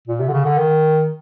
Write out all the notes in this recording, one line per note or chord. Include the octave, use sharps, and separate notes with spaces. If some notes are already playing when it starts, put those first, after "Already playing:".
A#2
C3
D3
C#3
D3
D#3